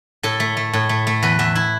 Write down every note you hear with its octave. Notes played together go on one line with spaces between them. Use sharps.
A2 A4
A3
A3
A2
A3
A3
E2 B4
E2 E5
E4